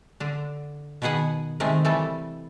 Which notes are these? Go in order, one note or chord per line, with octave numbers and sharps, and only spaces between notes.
D3 D4
B2 D#3 B3 G#4 F#5 G#5
C3 D#3 G#3 A3
E3 G3 A3 A4